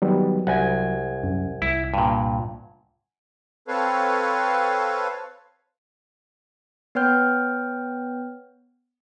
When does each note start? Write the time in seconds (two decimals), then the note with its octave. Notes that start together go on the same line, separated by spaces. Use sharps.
0.02 D#3 F#3 G3 B3
0.47 C2 F#5 G#5 G#6
1.24 F#2
1.62 C2 E4
1.94 G2 A#2
3.68 C4 A4 B4 C#5 F5
6.95 B3 B4 C#5 G5 F6 G6